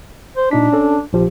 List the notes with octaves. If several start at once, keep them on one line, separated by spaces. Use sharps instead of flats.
C5
A#2 D4 D#4 B6
C#4 A4
A#1 F3 G4